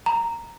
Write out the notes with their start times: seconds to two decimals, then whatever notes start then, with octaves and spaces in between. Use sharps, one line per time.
0.06 A#5